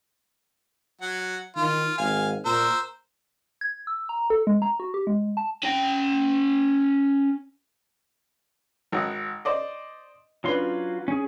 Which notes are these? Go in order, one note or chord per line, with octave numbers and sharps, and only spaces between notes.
F#3 F#5
D#3 F4
G#1 F5 G#5
A#2 A#4 C5 E6
G#6
E6
A#5
A4
G#3
A#5
F#4
G4
G#3
A5
C#4 G5
G#1 F#5 D#6
C5 D5 D#5
F#3 C#4 D4 F4 B4 C6
C#4 G#4